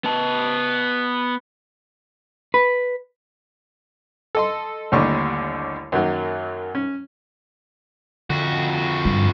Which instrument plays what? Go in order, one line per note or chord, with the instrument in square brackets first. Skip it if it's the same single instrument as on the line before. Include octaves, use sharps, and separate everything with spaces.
[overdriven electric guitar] B3 A5
[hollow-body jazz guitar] B4
[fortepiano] A4 D#5 C6
A1 D#2 D3 G3 C#6
F#2 D#3 F#3 A#3
C#4
[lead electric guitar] F2 F#4 [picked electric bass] D3
[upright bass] G2